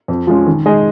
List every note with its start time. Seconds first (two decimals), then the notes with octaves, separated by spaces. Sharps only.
0.08 F2
0.27 F3 G#3 C#4
0.46 D#3
0.66 G#3 D#4 G#4 D#5